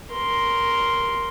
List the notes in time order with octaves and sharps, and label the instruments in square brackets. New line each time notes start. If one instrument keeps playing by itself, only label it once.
[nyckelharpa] A#4 C6